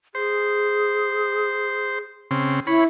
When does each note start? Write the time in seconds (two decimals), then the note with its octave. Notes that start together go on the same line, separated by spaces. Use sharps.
0.15 G#4 C5
2.31 C#3 C4
2.67 E4 C#5 B5